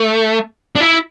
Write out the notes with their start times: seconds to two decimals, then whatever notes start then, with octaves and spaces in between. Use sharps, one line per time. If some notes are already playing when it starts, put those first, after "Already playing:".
Already playing: A3
0.76 D4
0.80 E4